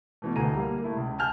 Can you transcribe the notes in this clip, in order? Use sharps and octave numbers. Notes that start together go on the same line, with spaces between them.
B2 E3 A3
D2 A2 A4 G#5 A#5 D#7
G3 A#3
A3 E4
C#2
G#5 A5 F6 G6